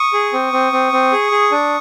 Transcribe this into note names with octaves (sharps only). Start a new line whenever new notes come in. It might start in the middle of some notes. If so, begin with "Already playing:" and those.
Already playing: C#6 D#6
G#4
C4
C4
C4
C4
G#4
G#4
D4